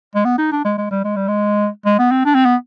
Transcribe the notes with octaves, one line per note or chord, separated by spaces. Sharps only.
G#3
B3
D#4
D4
G#3
G#3
G3
G#3
G3
G#3
G#3
B3
C4
D4
C4
B3